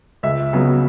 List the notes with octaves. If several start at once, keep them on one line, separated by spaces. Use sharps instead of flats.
C#2 E5
C#3 F#3 B3